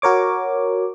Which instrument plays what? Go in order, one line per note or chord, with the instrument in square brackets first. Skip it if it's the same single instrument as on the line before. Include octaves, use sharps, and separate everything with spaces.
[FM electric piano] F#4 A#4 C#5 D6